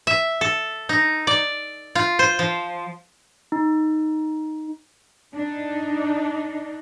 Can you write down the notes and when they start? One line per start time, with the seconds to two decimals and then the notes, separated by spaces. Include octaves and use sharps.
0.07 E5
0.41 A4
0.89 D#4
1.27 D5
1.95 F4
2.19 C5
2.39 F3
3.52 D#4
5.34 D4 D#4